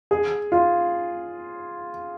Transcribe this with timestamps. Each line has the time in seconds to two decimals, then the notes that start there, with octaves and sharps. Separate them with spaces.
0.11 G#4
0.52 F4